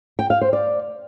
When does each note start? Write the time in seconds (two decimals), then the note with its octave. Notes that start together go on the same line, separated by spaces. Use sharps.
0.19 G5
0.30 F5
0.41 C5
0.53 D5